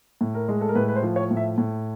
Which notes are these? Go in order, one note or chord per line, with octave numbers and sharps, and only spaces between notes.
A2
A#4
G#3
A4
A#4
A2 B4
B4
C5
F3
C#5
A2
E5
A2